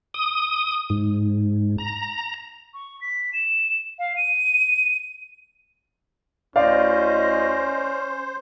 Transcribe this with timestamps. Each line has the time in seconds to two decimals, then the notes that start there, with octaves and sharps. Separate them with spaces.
0.14 D#6
0.90 G#2
1.78 A#5
2.74 C#6
3.01 B6
3.33 E7
3.99 F5
4.16 D#7
6.56 D2 C#4 E4 C5 D5 D#5 F5